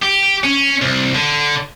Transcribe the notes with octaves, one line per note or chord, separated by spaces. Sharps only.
G4
C#4
C2
D3